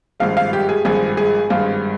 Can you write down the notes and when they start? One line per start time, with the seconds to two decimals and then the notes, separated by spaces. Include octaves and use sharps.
0.20 G#1 G2 F3 G#3 F5
0.37 F5
0.53 G4
0.69 G#4
0.85 G#1 G2 F3 G#3 G#4
1.17 G#4
1.50 G#1 G2 F3 G#3 F4